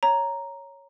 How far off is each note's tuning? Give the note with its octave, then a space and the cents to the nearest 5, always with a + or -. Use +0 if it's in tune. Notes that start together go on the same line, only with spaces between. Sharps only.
C#5 +0 A#5 +0